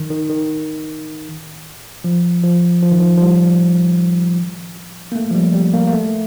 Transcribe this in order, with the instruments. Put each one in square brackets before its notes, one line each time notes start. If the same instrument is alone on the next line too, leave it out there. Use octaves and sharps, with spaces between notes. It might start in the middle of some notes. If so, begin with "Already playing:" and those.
Already playing: [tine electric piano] D#3
D#3
D#3
F3
F3
F3
D#3
F3
F3
G3
A#3
A3
F3
G3
G3
A#3
A#3
A3